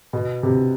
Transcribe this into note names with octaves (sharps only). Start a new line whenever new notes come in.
B2
C3